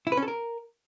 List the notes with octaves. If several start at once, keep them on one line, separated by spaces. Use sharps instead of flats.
E4
B4
C#4
A4
A#4